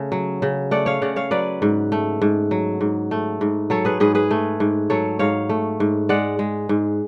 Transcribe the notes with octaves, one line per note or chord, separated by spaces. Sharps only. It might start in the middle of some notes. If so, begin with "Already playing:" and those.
Already playing: C#3 A3
F#3
C#3
A3 D5 F#5
C#5 F5
C#3 D5 F#5
C#5 F5
F#3 B4 D5
G#2
A3
G#2
F#3
G#2
A3
G#2
F#3 A4 C#5
G#4 B4
G#2 G#4 B4
G#4 B4
A3
G#2
F#3 A4 C#5
G#2 C#5 F5
A3
G#2
G#3 D5 F#5
G#3
G#2